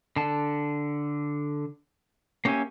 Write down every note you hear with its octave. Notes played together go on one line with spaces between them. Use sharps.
D3 A5
A#3 C#4 G4 E5 G#5